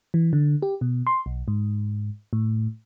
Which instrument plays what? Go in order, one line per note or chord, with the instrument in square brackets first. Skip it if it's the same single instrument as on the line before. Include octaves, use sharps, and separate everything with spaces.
[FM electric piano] E3
D3
G4
B2
C6
B1
G#2
A2